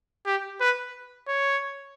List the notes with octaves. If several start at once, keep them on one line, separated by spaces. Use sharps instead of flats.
G4
B4
C#5